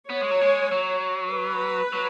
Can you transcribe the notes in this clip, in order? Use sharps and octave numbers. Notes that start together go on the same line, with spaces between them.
B3 C#5
G#3
F#3
G#3
F#3
B4
F#3